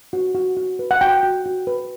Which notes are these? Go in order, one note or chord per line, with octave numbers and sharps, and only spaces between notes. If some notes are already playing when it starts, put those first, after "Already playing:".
F#4
F#4
F#4
B4
F#5
F#4 G5
F#4
F#4
B4